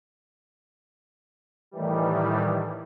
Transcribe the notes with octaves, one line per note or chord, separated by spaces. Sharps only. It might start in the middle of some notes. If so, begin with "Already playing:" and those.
A2 D#3 E3 G3